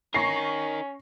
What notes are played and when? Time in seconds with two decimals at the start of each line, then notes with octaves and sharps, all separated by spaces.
0.14 C#4 D#4 A#4 C#6 A#6 C7